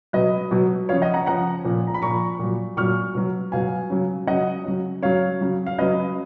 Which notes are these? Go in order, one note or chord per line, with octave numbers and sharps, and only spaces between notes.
B2 F#3 B4 D#5
B2 F#3
C#3 F3 C#5 F5
D#5 F#5
F#5 A#5
C#3 F3 F#5 A#5
A#2 F3
A#5
B5
A#2 F3 A#5 C#6
A#2 F#3
A#2 F#3 C#6 F6
B2 F#3
B2 F#3 F5 G#5
C#3 F#3
C#3 F#3 D#5 F#5
C#3 F#3
C#3 F#3 C#5 F5
C#3 F#3
F5
C#3 F#3 B4 D#5